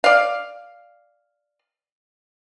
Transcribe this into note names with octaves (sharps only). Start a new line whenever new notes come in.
D5 F5